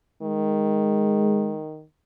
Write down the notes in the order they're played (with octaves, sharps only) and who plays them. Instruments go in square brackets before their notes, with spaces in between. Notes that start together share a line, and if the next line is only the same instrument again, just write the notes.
[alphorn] D#3 [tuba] G#3